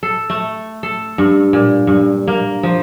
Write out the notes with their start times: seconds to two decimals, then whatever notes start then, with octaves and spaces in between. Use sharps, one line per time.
0.03 A4
0.30 A3
0.83 A4
1.18 G2
1.53 A#2
1.87 G2
2.27 A#3
2.63 F3